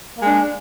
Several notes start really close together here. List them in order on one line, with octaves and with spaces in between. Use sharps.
A#3 G#3 D4